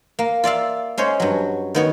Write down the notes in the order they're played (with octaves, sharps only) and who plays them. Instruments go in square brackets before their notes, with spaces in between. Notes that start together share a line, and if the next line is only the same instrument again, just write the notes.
[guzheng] A#3
F4 D5 E5 F5
G#3 C#4 C5 C#5
G2 F#3
D#3 B3 C#5